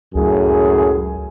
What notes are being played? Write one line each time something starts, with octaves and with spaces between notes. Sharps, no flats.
C#2 F#2 A2 G#4